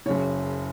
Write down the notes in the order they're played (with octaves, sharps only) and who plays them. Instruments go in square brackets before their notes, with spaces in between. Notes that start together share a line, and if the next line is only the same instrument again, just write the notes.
[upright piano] F#1 F#2 C#3 C#5